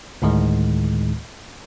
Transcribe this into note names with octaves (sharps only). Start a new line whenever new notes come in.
D2 A2 D#3 G#3